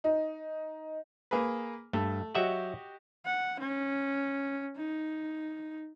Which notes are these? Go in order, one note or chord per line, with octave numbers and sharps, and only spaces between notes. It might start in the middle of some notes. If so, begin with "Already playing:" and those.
D#4
A#3 G#4 B4
G2 A3
F#3 F#4 G4 D#5 E5 F#5
F#5
C#4
D#4